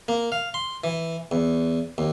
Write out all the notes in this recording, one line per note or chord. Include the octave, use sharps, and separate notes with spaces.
A#3
F5
C6
E3
E2
D#2